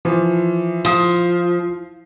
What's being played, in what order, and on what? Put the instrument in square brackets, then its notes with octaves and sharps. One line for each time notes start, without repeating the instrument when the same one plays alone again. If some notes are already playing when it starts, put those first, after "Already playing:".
[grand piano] E3 F3 F4
[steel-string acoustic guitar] F3 [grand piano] C6 D#6